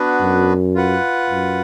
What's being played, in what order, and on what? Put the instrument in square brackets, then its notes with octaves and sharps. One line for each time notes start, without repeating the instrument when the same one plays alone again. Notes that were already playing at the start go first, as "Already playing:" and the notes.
Already playing: [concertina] B3 D4 F#4 B4
[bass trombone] F#2
[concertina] F4 B4 F#5
[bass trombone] F#2